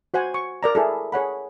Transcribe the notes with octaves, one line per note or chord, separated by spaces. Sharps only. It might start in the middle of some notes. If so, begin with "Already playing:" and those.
F#4 C5 F#5 G#5
C#6
A#4 D5 A#5
E4 G#4 A4
G#4 C#5 F#5 B5